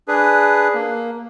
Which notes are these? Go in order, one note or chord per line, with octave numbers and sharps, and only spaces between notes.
D4 G#4 B4
A#3